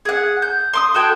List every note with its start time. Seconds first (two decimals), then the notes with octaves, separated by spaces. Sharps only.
0.05 G#4 F#5
0.42 G6
0.73 C6 D6 D#6
0.94 F#4 A4 G5 G#5